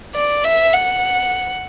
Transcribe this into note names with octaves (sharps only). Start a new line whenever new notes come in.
D5
E5
F#5